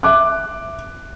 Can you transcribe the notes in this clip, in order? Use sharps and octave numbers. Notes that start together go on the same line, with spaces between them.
E5 D6 F#6